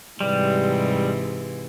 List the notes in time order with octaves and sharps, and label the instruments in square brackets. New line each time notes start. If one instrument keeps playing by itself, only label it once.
[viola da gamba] G#2 C3 E3 [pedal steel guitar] G3